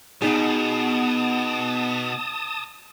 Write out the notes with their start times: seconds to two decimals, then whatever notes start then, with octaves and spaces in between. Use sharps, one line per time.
0.22 B2 B3 D#4 G#4 A5 D#6